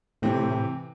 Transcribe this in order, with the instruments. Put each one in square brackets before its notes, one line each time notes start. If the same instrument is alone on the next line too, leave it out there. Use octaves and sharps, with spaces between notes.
[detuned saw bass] A2 [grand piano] C3 E3 C4 G4